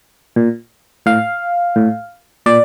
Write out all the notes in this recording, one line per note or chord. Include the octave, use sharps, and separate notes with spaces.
A#2
A2 F5
A2
A#2 D5